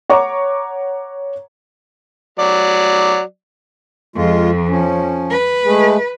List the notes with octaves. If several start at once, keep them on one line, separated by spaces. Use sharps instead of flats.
C#5 F#5 A#5 C#6 D6
F#3 D5
F2 G#3 F4
F3 C#4
B4
G#3 A3 G#4